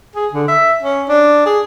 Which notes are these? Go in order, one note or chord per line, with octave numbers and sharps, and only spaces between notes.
G#4
D3
E5
C#4
D4
G#4